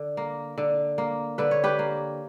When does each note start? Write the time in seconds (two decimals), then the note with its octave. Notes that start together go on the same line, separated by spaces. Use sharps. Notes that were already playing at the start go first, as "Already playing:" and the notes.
Already playing: D3
0.17 A#3
0.58 D3
0.98 A#3
1.38 D3 B4
1.51 C#5
1.64 G4 B4
1.79 A#3